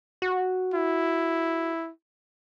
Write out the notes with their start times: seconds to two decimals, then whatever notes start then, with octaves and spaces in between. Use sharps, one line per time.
0.22 F#4
0.74 E4